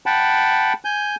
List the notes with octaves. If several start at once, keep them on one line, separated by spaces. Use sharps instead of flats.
F#5 G5 A5 B5
G#5 G6